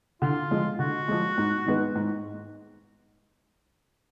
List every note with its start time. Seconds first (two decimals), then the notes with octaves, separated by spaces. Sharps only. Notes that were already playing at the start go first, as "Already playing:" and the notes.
0.22 D3 F4
0.51 F3 G#3
0.79 D3 F#4
1.08 F3 G#3
1.38 G#2
1.66 D#3 G#3 B3
1.95 G#2